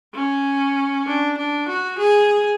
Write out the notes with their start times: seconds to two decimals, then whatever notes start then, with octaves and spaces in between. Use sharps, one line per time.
0.15 C#4
1.06 D4
1.37 D4
1.68 F#4
1.98 G#4